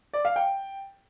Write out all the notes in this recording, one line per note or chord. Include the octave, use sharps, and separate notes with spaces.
D5
F5
G5